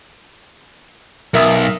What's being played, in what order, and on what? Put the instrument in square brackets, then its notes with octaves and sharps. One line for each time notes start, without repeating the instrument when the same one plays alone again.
[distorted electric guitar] B1 [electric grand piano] A#4 E5 D#6